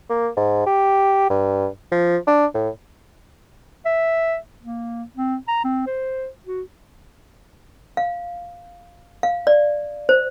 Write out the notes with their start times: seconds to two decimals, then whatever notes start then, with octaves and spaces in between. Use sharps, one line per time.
0.10 A#3
0.37 G#2
0.67 G4
1.30 G2
1.92 F3
2.27 D4
2.54 A2
3.86 E5
4.62 A#3
5.16 C4
5.48 A#5
5.64 C4
5.87 C5
6.46 F#4
7.97 F5
9.23 F5
9.47 D5
10.09 C5